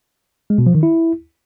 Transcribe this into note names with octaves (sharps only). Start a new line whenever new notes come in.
G#3
B2
F3
D#3
E4